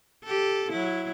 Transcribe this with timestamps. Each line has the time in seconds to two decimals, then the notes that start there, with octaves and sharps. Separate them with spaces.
0.24 G4 A4
0.72 F#3 E4